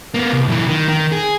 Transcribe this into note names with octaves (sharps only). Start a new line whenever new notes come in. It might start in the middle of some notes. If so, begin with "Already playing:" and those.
A#3 B3
C2
B1 E3
D#3
D#3
G#4